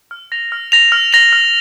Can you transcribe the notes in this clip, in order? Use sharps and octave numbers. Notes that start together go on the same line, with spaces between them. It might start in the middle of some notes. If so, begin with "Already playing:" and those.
F6
A#6 F7
F6
A#6 F7
F6
A#6 F7
F6